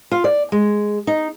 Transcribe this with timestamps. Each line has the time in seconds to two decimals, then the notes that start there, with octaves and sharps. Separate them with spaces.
0.11 F4
0.24 D5
0.52 G#3
1.07 D#4